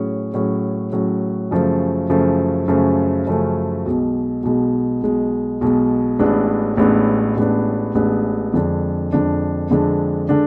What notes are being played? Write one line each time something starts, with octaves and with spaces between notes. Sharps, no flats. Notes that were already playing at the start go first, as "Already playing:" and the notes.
Already playing: A2 F#3 C#4 G#4
A2 F#3 C#4 G#4
A2 F#3 C#4 G#4
F#2 C#3 F3 A3
F#2 C#3 F3 A3
F#2 C#3 F3 A3
F#2 C#3 F3 A3
B1 B2 G#3
B1 B2 G#3
B1 B2 G#3
B1 B2 G#3
A1 A2 G#3 B3 D4
A1 A2 G#3 B3 D4
A1 A2 G#3 B3 D4
A1 A2 G#3 B3 D4
F2 D3 G#3 D4
F2 D3 G#3 D4
F2 D3 G#3 D4
D3 G#3 D4